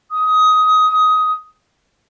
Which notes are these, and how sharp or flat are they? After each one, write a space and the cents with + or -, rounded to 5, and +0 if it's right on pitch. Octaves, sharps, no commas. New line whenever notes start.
D#6 +15